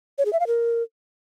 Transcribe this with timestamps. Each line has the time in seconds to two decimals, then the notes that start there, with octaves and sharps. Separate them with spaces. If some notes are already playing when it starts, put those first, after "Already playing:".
0.18 C#5
0.25 G#4
0.33 E5
0.40 F5
0.47 A#4